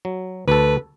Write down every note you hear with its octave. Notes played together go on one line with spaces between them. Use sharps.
F#3
D2 A4 B4